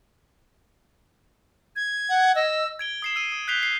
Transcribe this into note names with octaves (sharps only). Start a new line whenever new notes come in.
G#6
F#5
D#5 E6
G#6 D7 G7
D#6 C7 E7
E6 D#7 E7
D#6
F#6 G6 B6 C7 F7 G7
C7